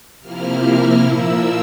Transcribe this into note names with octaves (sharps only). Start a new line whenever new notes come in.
C3 F3 A#3 E4 F6
A#2 F3 A#3 E4 E6